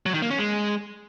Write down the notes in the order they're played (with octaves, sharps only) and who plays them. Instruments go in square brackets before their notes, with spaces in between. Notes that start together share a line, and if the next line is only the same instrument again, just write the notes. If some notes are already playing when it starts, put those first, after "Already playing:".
[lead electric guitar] F#3
D#3
A#3
C#4
G#3